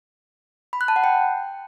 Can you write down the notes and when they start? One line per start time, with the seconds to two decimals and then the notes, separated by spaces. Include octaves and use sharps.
0.73 B5
0.81 F#6
0.88 A5
0.96 F#5
1.04 G5